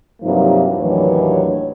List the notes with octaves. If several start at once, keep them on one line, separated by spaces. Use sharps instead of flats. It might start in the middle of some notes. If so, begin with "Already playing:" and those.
G2 C3 F3 F#3 A#3 D#4
D#2 A2 E3 F#3 D4 C#5